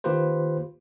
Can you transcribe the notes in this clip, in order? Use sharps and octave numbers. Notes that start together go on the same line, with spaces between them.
D#3 A#3 F4 G4 B4 C5